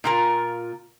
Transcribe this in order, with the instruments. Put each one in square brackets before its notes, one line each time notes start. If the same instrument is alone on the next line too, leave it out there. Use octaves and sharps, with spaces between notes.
[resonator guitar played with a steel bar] A#2 F4 A#4